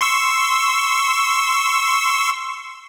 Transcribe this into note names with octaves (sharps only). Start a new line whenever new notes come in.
C6 C#6 E6